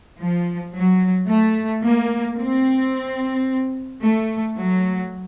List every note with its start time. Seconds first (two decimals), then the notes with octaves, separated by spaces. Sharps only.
0.18 F3
0.73 F#3
1.27 A3
1.83 A#3
2.38 C4
4.02 A3
4.57 F#3